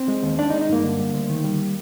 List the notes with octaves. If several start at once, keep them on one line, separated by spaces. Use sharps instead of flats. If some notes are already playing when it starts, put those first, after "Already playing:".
Already playing: C4
G#3
D#2
D#3 D4
D#4
G#3
D#4
G2 A#3
D3
G3
D2
D#3
G3